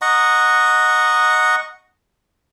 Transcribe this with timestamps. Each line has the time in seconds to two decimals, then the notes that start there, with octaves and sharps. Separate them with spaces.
0.02 D#5 F#5 A#5 C#6